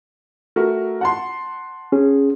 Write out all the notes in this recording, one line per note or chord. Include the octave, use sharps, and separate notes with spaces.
A3 F#4 A#4
F#5 A5 C6
C#4 G#4